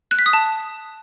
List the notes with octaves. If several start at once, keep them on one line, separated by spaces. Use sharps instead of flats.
F#6
B6
D#6
A5